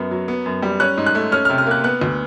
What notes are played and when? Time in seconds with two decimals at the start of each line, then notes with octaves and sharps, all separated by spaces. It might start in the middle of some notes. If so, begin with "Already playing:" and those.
Already playing: F#2 B3
0.11 F#3
0.28 B3
0.46 F#2
0.62 G3
0.80 C#4 F#6
0.97 G#2
1.06 F#6
1.15 A3
1.32 C#4 F6
1.45 F6
1.50 C3
1.58 F6
1.67 A#3 F#6
1.84 B3 F#6
2.02 D2